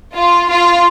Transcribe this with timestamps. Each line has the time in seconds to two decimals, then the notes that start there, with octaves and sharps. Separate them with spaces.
0.15 F4
0.50 F4